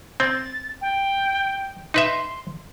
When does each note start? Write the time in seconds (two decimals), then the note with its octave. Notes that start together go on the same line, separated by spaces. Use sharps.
0.20 C4 A6
0.81 G5
1.94 D#4 B4 E5 C6